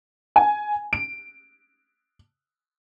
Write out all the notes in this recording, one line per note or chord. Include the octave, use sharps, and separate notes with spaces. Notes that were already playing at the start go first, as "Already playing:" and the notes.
G#5
D7